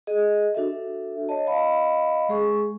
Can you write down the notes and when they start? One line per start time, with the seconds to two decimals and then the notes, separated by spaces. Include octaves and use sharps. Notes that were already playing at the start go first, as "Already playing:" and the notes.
0.07 G#4 D#5
0.55 D4 F#4 A4 E5
1.29 C#5 D#5 A5
1.47 D#5 F5 B5
2.29 G#3 G#4 C#6